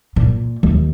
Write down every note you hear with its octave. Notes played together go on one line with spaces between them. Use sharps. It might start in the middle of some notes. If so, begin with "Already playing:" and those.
A#2
D#2